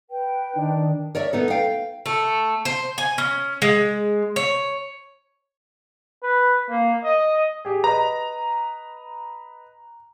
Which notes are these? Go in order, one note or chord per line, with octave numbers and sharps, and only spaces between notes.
B4 G5
D#3 D4 D#4
A#4 C#5 D5 E5
B3 D#4 A4
F5 G5
A3
C5
G#5
C#4
G#3
C#5
B4
A#3
D#5
G4 G#4
B4 D#5 A#5